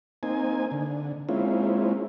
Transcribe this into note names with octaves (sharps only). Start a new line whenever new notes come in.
A#3 C4 D#4 G#5
D3
G#3 A#3 C4 C#4 E4 F4